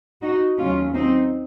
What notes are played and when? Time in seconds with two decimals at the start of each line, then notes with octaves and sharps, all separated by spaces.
0.22 D#4 F#4
0.58 D#2 C#3 F#3 A3 C#4 F4
0.94 C4 D#4